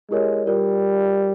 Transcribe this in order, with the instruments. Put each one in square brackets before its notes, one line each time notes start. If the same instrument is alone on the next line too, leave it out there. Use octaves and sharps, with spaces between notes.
[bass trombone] G#3 [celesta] E4 G4 A#4 C#5
[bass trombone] G3 [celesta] F4 A#4 D5